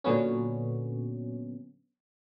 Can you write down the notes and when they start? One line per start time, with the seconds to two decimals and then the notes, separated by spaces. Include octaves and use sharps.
0.04 A#2 D3 F#3 B3 C#4